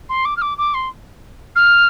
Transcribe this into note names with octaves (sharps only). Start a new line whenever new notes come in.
C6
D6
F6
D6
D6
C6
F6